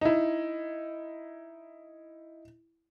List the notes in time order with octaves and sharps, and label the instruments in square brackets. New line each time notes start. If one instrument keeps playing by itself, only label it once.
[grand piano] D#4 E4